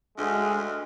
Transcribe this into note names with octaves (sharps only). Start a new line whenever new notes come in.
D2 G#3